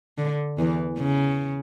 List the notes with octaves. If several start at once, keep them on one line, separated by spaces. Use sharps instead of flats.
D3
E2 E3
C#3